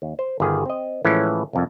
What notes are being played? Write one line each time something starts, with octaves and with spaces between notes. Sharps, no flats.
D#2
C5
G1 D#3 G4 G#4
C4 D#5
A2 E3 F3 G#3 C#4
C2 F2